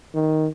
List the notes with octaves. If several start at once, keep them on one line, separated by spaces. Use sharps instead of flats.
D#3